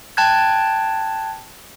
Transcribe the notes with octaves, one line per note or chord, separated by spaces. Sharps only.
G5 A5 F#6 G#6